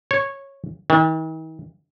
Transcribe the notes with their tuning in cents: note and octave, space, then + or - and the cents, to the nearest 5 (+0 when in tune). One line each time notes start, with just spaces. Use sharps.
C#5 -10
D#3 +45